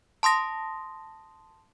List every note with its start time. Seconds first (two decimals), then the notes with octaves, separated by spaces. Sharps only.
0.23 A5 C6 D#6 A#6